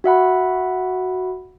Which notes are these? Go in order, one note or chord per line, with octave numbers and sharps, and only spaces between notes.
F#4 E5 F#5 B5